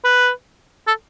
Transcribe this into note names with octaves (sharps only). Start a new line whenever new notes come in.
B4
A4